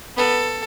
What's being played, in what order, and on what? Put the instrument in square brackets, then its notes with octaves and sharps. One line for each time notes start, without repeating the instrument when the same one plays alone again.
[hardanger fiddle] B3 [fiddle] A4